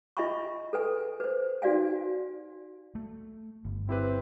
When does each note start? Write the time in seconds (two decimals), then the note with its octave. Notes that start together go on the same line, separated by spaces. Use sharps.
0.17 F4 D#5 E5 G#5 B5 C#6
0.73 A4 B4 G#5
1.20 B4 C5
1.62 D#4 F#4 D5 F5 G#5
2.95 A3
3.65 G1
3.89 C4 E4 G4 B4